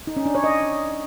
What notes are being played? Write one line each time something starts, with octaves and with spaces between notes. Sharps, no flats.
D#4
C#4
D4
C#5
D#5